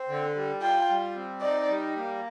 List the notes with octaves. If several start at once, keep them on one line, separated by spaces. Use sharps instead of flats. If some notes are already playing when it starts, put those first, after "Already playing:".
Already playing: C4
D3
G3
F4 G5
G3
C4
D#4 D5
G3
A#3